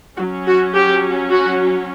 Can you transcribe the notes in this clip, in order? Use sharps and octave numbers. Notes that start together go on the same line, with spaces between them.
F#3 C#4 F#4
F#4
G4
F#4